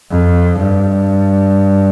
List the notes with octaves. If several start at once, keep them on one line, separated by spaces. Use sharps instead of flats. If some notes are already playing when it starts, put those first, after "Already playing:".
F2
G2